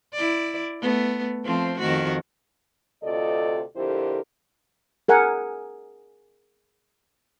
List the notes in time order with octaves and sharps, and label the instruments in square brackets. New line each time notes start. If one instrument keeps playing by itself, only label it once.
[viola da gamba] E4 D5
A3 B3
F3 A3 C4
F2 D#3 F#4
[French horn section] D2 C3 F4 A4 D5 D#5
F2 D3 E4 G4 A#4 C5
[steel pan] G#4 A#4 F#5 G#5